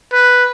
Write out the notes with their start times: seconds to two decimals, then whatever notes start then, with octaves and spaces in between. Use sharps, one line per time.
0.13 B4